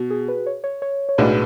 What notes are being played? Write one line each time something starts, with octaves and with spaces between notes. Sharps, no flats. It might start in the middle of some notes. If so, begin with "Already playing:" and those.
Already playing: B2 F#4
G#4
B4
C#5
C#5
C#5
C#5
B1 A2 G#3 D4 F#4 B4